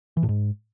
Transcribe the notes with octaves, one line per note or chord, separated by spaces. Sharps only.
E3
A2
G#2